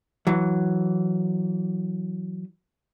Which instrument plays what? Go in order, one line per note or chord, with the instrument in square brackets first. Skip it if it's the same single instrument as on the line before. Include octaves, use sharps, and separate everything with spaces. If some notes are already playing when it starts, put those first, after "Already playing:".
[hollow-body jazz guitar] E3 F#3